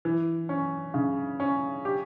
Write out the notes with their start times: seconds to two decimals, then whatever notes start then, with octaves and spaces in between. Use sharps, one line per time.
0.05 E3
0.49 C#4
0.94 C#3
1.40 C#4
1.85 G4